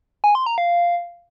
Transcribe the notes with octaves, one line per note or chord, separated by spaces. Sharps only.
G#5
C6
A#5
F5